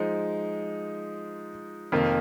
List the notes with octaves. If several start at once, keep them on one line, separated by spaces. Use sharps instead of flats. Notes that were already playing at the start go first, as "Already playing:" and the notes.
Already playing: F3 G#3 D#4
F2 C3 D#3 A#3 F4